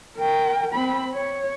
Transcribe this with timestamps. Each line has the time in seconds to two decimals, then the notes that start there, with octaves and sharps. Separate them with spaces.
0.18 A#4 G5
0.74 C4 B5
1.14 C#5